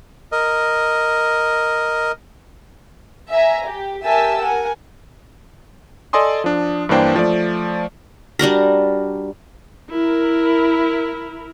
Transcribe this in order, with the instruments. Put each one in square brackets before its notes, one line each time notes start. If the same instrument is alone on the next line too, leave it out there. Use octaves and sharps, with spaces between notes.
[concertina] A#4 D#5
[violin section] E5 G#5 A#5
G4
G4 A#4 E5 G#5 A5 E6
A#4 F#5 G#5
[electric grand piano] A4 D5 D#5 G#5 C6 D#6
F3 D4
G2 E3 A#3 D4 C5 G5
F3 A3 D5
[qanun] G3 D4 F#4 A#4
[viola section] E4 A#4